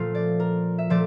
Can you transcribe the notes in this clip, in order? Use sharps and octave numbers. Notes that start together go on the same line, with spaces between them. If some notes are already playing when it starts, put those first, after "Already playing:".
Already playing: A#2 F3 A3 F5
D5
A#4
E5
A#2 F3 A3 D5